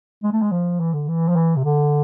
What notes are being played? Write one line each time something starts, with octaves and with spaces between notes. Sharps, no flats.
G#3
A3
G#3
F3
E3
D3
E3
F3
E3
C3
D3